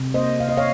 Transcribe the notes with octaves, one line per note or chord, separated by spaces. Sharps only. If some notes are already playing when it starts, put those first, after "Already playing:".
Already playing: C3
A#3 C5 D#5
C3 F5
D#5
C#5 F5